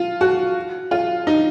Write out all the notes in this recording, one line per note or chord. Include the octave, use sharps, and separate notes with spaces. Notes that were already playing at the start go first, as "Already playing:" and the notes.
Already playing: F4
F#4
F4
D#4